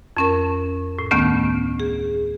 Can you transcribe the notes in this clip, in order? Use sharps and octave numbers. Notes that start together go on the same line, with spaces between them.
F2 C#4 A#4
A2
D2 D#3 A3 B3 C#4
G#4